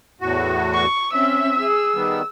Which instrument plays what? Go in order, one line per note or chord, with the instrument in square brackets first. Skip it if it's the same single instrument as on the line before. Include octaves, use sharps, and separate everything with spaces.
[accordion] E2 A2 F#4
[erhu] C#6
[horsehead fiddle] C4 C#4 [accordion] E5 [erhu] E6
[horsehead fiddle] G#4
[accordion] D#3 G3 B3